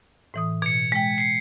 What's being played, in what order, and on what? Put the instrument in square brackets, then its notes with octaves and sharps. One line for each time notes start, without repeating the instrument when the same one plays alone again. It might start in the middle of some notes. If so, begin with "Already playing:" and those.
[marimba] A2 E3 D#6
[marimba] B2 [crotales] G#6 C#7
[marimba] G#3 G5 [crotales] B6
[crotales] C7 C#7